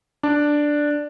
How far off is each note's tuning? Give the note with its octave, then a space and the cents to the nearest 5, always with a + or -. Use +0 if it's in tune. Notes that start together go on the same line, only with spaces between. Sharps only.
D4 +0 D5 +0